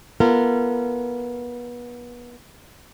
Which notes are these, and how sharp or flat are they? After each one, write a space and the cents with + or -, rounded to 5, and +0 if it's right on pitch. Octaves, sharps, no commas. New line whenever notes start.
B3 -30 F4 -25 A#4 -30